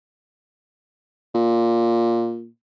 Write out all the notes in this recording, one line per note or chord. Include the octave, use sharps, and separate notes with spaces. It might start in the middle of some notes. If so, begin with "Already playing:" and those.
A#2